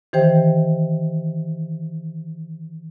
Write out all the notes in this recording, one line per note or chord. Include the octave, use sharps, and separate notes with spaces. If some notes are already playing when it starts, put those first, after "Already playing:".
D#3 E3 G4 C5 G5